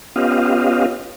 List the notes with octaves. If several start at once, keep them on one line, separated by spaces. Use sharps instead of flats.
B3 C#4 F4 G4 D#5 F5